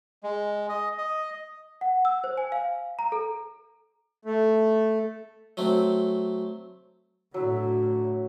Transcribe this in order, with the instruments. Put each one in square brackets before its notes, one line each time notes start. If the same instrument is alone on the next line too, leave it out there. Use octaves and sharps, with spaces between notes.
[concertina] G#3
D#5
D#5
[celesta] F#5
E6
C5
G#5
F5
A#5
A4
[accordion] A3
[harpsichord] F#3 A3 C4
[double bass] A2 D3 [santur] F#3 E4